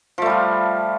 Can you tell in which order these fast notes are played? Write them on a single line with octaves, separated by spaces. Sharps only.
F3 A3 G3 F4